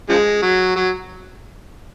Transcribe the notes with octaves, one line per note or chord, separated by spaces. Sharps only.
C#3 F3 G#3
F#3
F#3